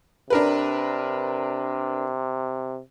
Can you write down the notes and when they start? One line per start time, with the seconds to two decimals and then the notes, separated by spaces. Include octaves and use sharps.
0.30 C3 D4 A#4 B4